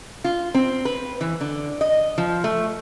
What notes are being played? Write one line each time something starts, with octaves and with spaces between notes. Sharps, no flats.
F4
C4
B4
E3
D3
D#5
F3
A3